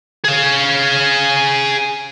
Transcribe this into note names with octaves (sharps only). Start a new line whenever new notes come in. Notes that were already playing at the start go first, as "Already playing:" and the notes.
G#4 F5